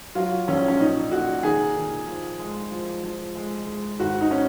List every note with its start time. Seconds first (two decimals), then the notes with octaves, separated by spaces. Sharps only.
0.15 F#3 F4
0.48 A#1 C#4
0.68 C#4
0.80 A#2 D#4
1.11 A#2 F#4
1.43 D#3 G#4
1.76 D#3
2.07 F3
2.39 G#3
2.72 F3
3.03 F3
3.35 G#3
3.67 G#3
4.00 G#1 F#4
4.21 D#4
4.31 C#4